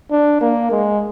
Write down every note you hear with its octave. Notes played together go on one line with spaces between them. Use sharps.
D4
A#3
G#3